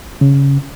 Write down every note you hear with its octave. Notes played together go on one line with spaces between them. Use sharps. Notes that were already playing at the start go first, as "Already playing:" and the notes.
C#3